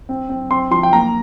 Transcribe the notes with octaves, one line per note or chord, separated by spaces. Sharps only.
C4
C4
C4 C6
F3 C6
G5
A#3 A#5